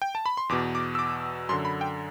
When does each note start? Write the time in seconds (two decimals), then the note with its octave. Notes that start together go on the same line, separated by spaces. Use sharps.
0.02 G5
0.15 A5
0.26 B5
0.37 C6
0.49 E2 B2 D6
0.75 D6
0.95 E6
0.99 D6
1.49 F#2 D3 C6
1.65 B5
1.81 G5